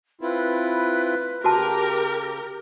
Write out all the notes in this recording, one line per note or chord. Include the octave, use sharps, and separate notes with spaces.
C4 E4 F4 B4
C#3 F#4 G4 A#4 A5